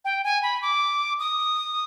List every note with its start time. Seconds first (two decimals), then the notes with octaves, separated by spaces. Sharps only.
0.05 G5
0.24 G#5
0.43 B5
0.62 D6
1.19 D#6